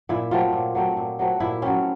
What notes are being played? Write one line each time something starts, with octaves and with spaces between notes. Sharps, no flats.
A#2 E4
F#3 A3 C4 F4
A#2
F#3 A3 C4
A#2
F#3 A3 C4
A#2 E4
F#3 A3 C4 C#4